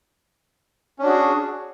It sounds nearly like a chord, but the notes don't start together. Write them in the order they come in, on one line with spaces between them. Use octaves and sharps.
C#4 D4 F#4 G#4